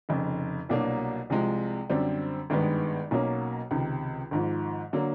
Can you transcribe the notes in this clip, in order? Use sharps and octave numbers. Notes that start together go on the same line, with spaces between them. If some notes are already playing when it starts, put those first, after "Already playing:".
F1 F2 C#3
C2 B2 F#3 A#3 D4
C2 C3 F3 G#3
F#2 D3 G3 C4
G#1 G2 D#3 G#3 B3
B1 B2 F#3 A#3 C#4
C#2 C3 D#3
G#1 G#2 F3
D3 F#3 A#3